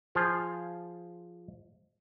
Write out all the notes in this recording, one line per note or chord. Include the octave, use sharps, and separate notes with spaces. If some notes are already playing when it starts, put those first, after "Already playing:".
F3 F4 G#4